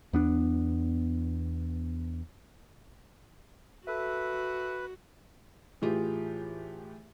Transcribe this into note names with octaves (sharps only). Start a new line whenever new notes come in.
E2 B3 D4
F#4 A4 B4 E5
A2 E3 F4 G4 G#4